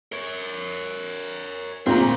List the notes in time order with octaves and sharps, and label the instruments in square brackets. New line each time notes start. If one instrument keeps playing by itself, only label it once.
[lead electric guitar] A#4 C#5
[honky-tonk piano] A#2 A#5 [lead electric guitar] A3 D4 [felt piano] C4